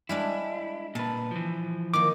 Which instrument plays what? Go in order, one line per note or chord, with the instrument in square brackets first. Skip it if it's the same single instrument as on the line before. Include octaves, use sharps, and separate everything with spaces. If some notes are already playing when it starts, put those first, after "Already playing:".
[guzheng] G3 G#3 D4 [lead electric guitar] E4
[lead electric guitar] A#2 B4 [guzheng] A5
[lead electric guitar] E3 F3
[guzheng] D#3 A#3 [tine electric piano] D6